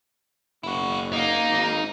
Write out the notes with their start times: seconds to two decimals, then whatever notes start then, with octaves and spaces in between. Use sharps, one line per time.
0.63 F#1 E4 F#4
1.13 A#3 D#4
1.50 G#1